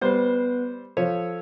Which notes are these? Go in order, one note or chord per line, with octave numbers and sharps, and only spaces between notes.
G3 B3 B4 C5
F3 A4 C#5